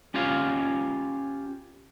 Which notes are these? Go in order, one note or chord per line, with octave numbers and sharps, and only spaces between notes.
C#4 F4 G4 C#5 F5